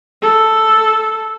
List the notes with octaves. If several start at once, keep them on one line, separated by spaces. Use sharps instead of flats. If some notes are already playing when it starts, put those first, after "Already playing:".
A4